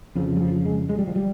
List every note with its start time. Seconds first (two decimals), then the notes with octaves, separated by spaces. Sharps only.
0.16 F2 C#3 F3
0.36 G3
0.41 F3
0.65 G#3
0.89 G#3
0.98 G3
1.07 F3
1.16 G3